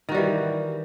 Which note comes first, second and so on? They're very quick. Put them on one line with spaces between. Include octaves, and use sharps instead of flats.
D#3 F#4 G3 E3